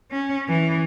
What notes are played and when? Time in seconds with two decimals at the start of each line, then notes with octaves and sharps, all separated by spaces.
0.12 C#4
0.48 E3